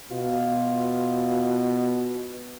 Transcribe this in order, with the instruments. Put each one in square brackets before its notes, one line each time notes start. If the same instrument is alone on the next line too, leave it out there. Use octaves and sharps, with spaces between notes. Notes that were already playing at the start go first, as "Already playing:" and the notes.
[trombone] B2 [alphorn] F4